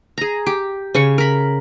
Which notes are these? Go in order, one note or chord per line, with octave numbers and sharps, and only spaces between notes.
G#4 A#5
G4
C#3 C#4 C#6
A#4 B5